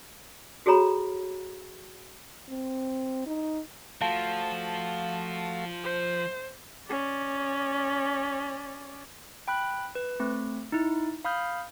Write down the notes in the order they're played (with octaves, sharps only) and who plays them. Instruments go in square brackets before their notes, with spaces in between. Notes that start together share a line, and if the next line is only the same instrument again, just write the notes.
[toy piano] F#4 G#4 A4 C#5 A#5 B5
[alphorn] C4
D#4
[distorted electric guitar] F3 [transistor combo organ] A3 F4 F#4 [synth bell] F5 A5
[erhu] C5
[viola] C#4 D5
[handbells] G5 B5 F#6
B4
A3 C4
D#4 E4
F5 B5 D#6 F6 G6